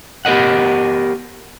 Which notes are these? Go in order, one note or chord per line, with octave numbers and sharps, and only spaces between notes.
B3 G4 A#4 D#5 F#5